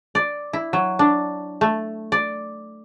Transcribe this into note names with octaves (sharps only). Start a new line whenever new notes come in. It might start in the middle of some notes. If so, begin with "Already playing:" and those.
D5
E4
F#3
D4
A3
D5